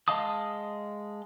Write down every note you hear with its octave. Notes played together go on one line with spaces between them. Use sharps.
G#3 D#5 F5 A5 D#6